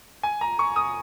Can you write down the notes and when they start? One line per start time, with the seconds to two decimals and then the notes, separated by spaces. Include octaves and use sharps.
0.23 G#5
0.41 A#5
0.59 C#6
0.76 D#6